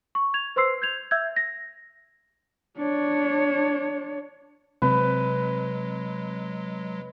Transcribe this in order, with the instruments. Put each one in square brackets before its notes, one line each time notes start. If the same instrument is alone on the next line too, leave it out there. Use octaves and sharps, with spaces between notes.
[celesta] C#6
G#6 F7
B4 C5 C6 E6 C7
G6 G#6 F7
E5 E6 G6 G#6
A#6
[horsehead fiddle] D4 C#5
[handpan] C3 C4 [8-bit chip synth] F#3 G#3 [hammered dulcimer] B4